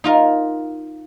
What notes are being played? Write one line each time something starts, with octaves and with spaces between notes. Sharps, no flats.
D#4 F4 A#4